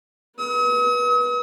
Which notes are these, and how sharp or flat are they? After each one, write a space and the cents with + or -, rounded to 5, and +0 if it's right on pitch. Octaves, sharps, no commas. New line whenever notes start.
B4 -25 D#6 +45